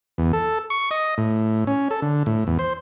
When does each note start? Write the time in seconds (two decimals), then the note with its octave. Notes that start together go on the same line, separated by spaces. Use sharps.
0.18 E2
0.33 A4
0.70 C#6
0.91 D#5
1.18 A2
1.67 C#4
1.91 A4
2.02 D3
2.26 A2
2.47 E2
2.59 C5